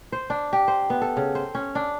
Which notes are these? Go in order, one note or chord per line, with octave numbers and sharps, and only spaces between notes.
C5
D4
G4
C5
B3
A4
C#3
C5
C#4
D4